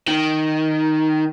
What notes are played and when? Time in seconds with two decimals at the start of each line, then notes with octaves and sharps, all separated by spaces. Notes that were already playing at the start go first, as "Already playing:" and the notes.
0.08 D#3